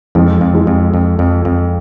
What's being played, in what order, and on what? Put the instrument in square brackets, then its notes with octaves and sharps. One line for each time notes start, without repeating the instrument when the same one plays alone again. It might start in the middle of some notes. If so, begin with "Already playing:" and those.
[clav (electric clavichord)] F2 [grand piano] F3 G#3
[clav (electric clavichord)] F2
[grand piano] F3 G#3
[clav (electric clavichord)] F2
F2
F2
F2